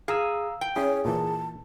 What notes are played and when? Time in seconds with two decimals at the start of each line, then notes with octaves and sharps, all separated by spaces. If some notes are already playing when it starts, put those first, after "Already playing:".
0.08 G#4 F5 A#5 E6
0.61 G5
0.76 C#4 E4 G#4 C#5
1.05 A#2 E3 A5